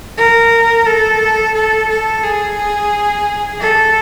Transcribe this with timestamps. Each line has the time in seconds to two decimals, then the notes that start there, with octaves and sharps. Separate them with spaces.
0.18 A#4
0.86 A4
1.55 A4
1.89 A4
2.23 G#4
3.60 A4